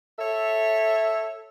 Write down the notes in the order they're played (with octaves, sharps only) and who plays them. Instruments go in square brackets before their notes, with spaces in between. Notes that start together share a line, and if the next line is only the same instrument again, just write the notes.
[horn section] A4 C#5 E5